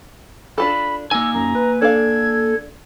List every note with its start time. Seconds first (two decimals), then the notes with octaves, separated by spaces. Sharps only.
0.58 D4 F4 A4 B5
1.11 A#3 D#4 G#5 E6
1.34 F#2 A#5
1.55 B4
1.82 D4 A4 F5 G#6